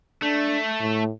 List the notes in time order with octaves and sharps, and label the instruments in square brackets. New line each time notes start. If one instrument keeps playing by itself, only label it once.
[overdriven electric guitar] A3 [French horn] D4
[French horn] A2